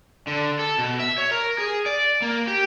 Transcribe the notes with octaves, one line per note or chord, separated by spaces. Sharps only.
D3
A4
B2
E5
C#5
A#4
G#4
D5
A#3
G4